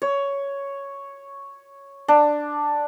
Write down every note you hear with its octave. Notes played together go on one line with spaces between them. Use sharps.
C#5
D4